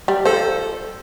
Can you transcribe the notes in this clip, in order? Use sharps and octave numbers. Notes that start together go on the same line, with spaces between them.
G3
F3 A4 C5